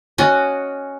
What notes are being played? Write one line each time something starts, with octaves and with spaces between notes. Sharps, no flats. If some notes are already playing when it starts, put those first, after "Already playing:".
C#4 F#4 D#5